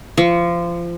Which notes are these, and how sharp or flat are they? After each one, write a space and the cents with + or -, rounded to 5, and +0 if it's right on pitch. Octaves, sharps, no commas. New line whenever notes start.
F3 -25 C#6 +20